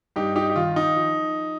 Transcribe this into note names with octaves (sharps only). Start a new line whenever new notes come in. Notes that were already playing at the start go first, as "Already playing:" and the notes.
G2 D#4 G4
D#4 G4
G4
D#3 F4
D#4
F3